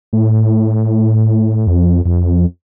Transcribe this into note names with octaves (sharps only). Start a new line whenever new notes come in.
A2
F2
F2